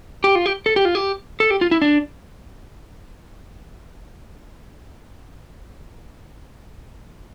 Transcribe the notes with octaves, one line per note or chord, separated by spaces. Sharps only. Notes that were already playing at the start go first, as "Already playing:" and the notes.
G4
F4
G4
A4
G4
F4
G4
A4
G4
F4
E4
D4